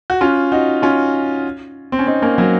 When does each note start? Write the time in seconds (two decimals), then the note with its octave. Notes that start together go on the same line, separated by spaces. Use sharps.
0.10 F#4
0.21 C#4 F4
0.52 D#4 F#4
0.82 C#4 F4
1.92 C4
1.99 C#4
2.07 C4 D#4
2.22 A#3 C#4
2.38 F#3 A#3